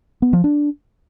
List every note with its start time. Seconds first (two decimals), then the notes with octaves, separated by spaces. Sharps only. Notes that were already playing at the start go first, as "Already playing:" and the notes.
0.22 B3
0.33 F3
0.44 D4